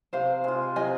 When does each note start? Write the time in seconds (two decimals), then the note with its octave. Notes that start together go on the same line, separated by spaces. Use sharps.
0.13 C3 C5 F5
0.44 G#3 F4
0.76 C3 D#5 G#5